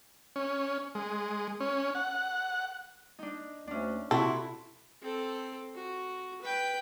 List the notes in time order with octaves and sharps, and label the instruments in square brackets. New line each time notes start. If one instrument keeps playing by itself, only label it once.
[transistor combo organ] C#4
G#3
C#4
F#5
[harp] D4 D#4
[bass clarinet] D2 [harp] C#4 D4
[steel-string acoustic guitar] C3 E4 [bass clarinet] F#4 [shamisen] A4 [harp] C6
[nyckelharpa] C4 A4
F#4
B4 G5